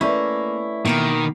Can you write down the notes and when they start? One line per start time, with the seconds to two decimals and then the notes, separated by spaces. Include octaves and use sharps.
0.01 A3 A#3 C#4 E4 B4 D5 C#6
0.85 B2 D#3 A#3 B4